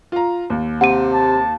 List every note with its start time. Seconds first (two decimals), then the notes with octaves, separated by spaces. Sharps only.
0.12 F4 A#5
0.50 D#2
0.81 C3 F#5 D#7
1.13 A5